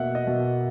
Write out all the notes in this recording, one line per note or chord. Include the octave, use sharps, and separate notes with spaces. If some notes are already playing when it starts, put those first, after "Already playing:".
Already playing: B2 A#3 E5 F#5
D#5
B2